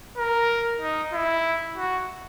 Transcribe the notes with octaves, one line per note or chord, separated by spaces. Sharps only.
A#4
D#4
E4
F#4